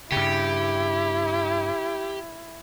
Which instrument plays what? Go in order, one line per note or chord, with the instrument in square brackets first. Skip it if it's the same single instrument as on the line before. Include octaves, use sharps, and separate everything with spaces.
[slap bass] G2 C#3 [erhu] E4 [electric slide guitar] G4